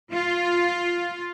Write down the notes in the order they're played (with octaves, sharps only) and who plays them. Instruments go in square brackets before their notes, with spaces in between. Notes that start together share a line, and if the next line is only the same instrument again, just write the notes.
[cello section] F4